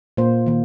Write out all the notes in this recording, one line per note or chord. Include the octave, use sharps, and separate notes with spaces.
A#2 A#3 C5
D#3 A#3